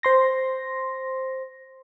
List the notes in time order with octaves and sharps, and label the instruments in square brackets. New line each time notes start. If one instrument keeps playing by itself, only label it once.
[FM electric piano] C5 C6 A#6